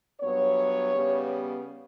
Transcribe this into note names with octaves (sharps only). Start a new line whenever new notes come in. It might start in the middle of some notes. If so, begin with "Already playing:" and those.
G2 F#3 B3 C#5
C#3 G3 B3